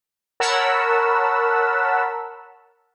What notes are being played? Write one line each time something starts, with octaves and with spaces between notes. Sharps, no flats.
A#4 C#5 F#5 A5 B5 E6